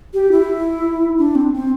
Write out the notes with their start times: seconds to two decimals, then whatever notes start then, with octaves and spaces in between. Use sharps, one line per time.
0.14 G4
0.32 E4
1.18 D4
1.35 C4
1.54 C4